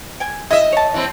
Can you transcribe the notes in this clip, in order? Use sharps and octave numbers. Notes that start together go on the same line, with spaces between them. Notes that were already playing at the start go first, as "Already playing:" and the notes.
G5 G#5
E4 D#5 E5
C#5 A5
E3 C4